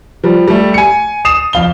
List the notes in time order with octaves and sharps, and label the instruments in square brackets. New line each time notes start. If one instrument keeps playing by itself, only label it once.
[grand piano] F3 G3
G3 A3
G#5 C#7
D#6 C7 E7
F2 F5 G7